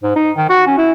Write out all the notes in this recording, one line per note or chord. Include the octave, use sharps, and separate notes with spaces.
G#2
D#4
D#3
F#4
C#4
E4